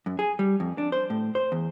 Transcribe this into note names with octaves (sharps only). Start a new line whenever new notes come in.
F#2
G#4
G3
F2
D4
C5
A2
C5
E2